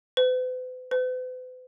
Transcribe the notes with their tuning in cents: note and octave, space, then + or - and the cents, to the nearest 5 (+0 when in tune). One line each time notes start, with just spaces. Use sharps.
B4 +45
B4 +45